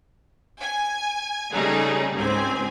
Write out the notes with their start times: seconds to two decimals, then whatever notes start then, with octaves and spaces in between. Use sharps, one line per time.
0.59 G#5
1.53 C#3 G3 A3 D#4 G#4
2.14 C#2 G#2 C4 G#5